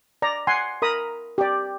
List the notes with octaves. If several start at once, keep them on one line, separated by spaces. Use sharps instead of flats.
D5 A#5
F#5 G#5 C6
A#4 A#5 B5 D#6
G4 D5